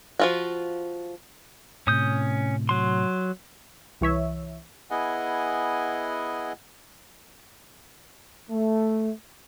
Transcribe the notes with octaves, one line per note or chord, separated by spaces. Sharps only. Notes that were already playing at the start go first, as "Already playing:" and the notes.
F3 F4 F#4
A2 C3 C#4 D#6 G6
F#3 C6
C2 E3 C#5 E5
B3 E4 G#4 D#5 F#5 G#5
A3